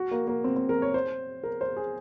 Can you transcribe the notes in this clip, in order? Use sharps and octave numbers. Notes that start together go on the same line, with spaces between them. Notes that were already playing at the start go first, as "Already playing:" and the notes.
Already playing: F#4
A#3
A#3
C4
C4
A#4
C#5
C5
A#4
C5
G#4